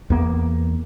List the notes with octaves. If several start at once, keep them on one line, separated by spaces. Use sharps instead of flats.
E2 A#3 B3